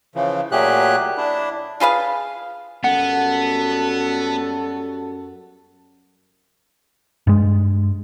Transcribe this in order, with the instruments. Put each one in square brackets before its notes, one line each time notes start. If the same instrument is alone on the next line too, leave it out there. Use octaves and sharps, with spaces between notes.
[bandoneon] C#3 E3 F3
A#2 F#3 A3 G4 G#4 F#6
D4 E4
[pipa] F4 G#4 B4 F5
[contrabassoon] F#2 [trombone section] G3 F#4 A4 [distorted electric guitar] B3 [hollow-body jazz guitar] F#5
[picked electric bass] G2 G#3